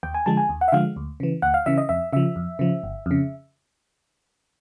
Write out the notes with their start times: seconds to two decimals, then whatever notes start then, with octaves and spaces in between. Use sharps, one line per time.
0.03 D#2 G5
0.14 G#5
0.26 D3 F3 G#3 A5
0.37 G#5
0.49 D#2
0.61 F#5
0.68 E5
0.72 D3 F3 G#3 F5
0.96 D2
1.20 C#3 E3
1.42 D2 F#5
1.54 F5
1.66 C#3 E3 E5
1.78 D#5
1.89 F2 E5
2.13 C#3 F3 E5
2.36 F2
2.59 C#3 F3
2.83 G1
3.06 F2 C#3